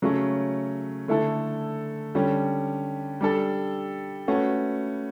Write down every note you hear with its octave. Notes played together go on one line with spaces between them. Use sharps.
C#3 F#3 A3 C#4
D3 A3 E4 A4
D3 G3 C#4 G4
G3 D4 A4
A3 C#4 F#4 B4